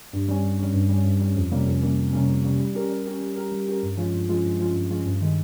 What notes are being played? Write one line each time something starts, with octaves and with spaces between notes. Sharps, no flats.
G2
G3 C#4
G2
G3 C#4
G2
G3 C#4
G2
G3 C#4
F2
C3 G3 A#3 C#4
F2
C3 G3 A#3 C#4
F2
C3 G3 A#3 C#4
F2
C3 G3 A#3 C#4
G3
C#4 G4 A#4
G3
C#4 G4 A#4
G3
C#4 G4 A#4
G3
C#4 G4 A#4
G2
F3 G#3 C#4 F4
G2
F3 G#3 C#4 F4
G2
F3 G#3 C#4 F4
G2
F3 G#3 C#4 F4
G2
D#3 G#3